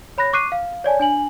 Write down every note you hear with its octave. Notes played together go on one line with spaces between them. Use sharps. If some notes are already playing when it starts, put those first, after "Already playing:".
C#5 B5 F#6 A#6
C#6 D6 F#6 C7 D#7
F5
C#5 D5 G#5 A5
D4 G#5 F#7